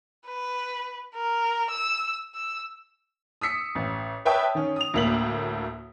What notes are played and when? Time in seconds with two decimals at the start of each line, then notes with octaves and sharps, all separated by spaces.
0.27 B4
1.15 A#4
1.70 E6
2.35 E6
3.41 D#6 E6 B6 C#7
3.75 A1
4.25 B4 C#5 E5 G5 A5 D#6
4.55 D#3 C#4
4.76 D#6 F7
4.94 D2 A2 A#3 B6 F#7